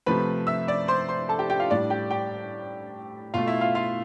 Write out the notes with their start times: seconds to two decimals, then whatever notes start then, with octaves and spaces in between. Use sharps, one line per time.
0.06 C3 F3 A3 B4 B5
0.47 E5 E6
0.68 D5 D6
0.88 C5 C6
1.09 C5 C6
1.29 A4 A5
1.39 G4 G5
1.50 G4 G5
1.59 F4 F5
1.70 A2 G3 D4 D5
1.90 G4 G5
2.11 G4 G5
3.34 B2 A3 F4 F5
3.48 E4 E5
3.61 F4 F5
3.75 F4 F5